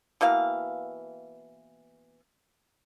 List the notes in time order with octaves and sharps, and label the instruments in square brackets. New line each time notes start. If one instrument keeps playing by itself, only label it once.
[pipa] B2 E3 A#3 F5